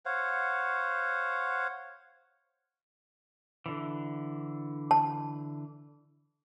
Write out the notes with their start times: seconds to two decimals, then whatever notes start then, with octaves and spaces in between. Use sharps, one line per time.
0.05 C5 C#5 F5 F#5
3.66 D3 E3
4.91 A5